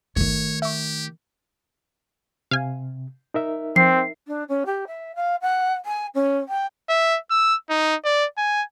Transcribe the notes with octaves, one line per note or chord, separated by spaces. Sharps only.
G1 D#3 A3 C#5
G4 E5 C#6
C3 F5 G#5
D#4 A#4 E5
F3 C4 C7
D4
C#4
G4
E5
F5
F#5
G#5
C#4
G5
E5
E6
D#4
D5
G#5